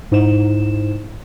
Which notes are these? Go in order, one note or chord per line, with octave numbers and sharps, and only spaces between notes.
G#2 D#4 E4 C5 E7